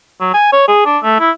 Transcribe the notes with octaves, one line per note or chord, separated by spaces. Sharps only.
F#3
G#5
C#5
G#4
D4
A3
E4